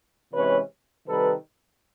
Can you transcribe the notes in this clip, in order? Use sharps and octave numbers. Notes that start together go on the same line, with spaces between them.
C3 E3 G#3 C#4 B4 C#5
C3 D#3 G3 A4 B4